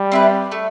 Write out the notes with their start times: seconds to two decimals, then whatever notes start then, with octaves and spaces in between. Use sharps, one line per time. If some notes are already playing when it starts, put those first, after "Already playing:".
Already playing: G3
0.12 C4 E4 B4
0.52 A3